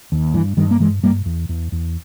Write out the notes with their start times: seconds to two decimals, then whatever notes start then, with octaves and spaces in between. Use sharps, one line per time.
0.12 D#2
0.34 G2 E3
0.57 G2 D#3 G3
0.71 A#3
0.80 G2 E3 G#3
1.03 G2 G3 A#3
1.26 E2
1.49 E2
1.72 E2